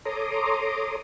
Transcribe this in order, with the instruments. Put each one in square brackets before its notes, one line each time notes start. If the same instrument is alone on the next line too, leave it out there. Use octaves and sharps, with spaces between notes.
[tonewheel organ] A4 C#5 A#5 C6 D6 D#6